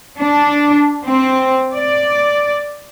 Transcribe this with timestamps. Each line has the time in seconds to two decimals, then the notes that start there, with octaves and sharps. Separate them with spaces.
0.18 D4
1.05 C4
1.74 D5